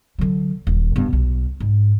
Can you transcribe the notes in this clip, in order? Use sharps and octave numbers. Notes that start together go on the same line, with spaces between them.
D3 F#3
D#1
G2 B3
B1
G#2